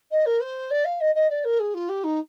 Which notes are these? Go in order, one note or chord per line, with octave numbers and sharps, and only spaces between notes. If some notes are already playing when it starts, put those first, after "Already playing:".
D#5
A#4
C5
D5
F5
D#5
D#5
D5
A#4
G#4
F4
G4
D#4